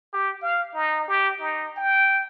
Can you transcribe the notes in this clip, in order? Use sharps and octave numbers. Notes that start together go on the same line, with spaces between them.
G4
F5
D#4
G4
D#4
G5